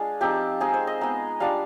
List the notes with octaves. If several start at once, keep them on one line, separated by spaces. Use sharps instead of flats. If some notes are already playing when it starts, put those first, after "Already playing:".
Already playing: G#3 D4 F4 G#4
F3 C4 D#4 G4
G#3 C4 D#4 G#4
C5
D#5
G#3 B3 D#4
G3 D4 F4 F5